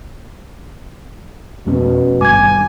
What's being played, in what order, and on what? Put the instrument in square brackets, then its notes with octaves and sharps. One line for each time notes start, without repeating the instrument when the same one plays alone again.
[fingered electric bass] F2 A3 C#4 [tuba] B2
[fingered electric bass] G#1 G2 [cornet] G#5 [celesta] D6 G#6